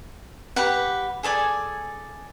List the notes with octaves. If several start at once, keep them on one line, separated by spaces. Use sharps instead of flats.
G4 B4 F#5
G#4 A4 D5 G#5